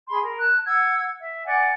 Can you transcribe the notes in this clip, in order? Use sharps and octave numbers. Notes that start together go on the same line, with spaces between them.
G#4 B5 C6
A#4
A5 F#6
F#5 E6 G#6
E5
D5 F#5 G#5